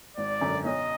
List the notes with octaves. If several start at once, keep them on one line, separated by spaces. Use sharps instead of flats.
G#1 D5
F#2 D3
B1 D#5